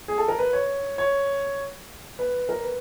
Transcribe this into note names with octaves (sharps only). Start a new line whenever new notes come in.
G#4
A4
A#4
B4
C#5
C#5
B4
A#4
B4